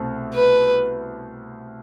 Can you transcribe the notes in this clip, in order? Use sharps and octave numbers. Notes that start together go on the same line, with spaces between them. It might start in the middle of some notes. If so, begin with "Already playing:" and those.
Already playing: C2 B2 A3 C4
B4